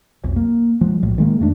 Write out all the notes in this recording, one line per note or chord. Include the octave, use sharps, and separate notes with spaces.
B1 F2
A#3
F3 F#3 G#3
B1 A2
D#3 G#3 A#3
F2 A3 D4